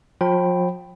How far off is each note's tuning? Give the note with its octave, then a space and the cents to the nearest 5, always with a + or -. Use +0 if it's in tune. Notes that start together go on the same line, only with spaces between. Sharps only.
F3 +40 G5 +0 B5 +10